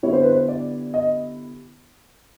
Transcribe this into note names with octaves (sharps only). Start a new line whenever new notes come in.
D3 G3 B3 E4 C#5
C5
B4
C5
D5
D#5